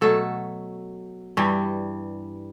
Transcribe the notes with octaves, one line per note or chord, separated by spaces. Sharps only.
B2 F#3 A3 A4
G2 E3 G3